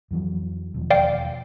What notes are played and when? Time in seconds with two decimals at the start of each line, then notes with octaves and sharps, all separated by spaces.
0.11 F2 E3 F#3
0.74 E1 D#2 F3
0.90 D5 F5 G5